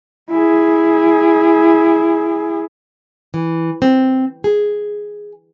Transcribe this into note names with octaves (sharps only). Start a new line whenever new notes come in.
E4 G#4
E3
C4
G#4